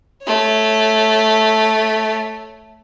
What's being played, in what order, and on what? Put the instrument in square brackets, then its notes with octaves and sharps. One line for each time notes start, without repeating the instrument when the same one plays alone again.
[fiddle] A3 C#5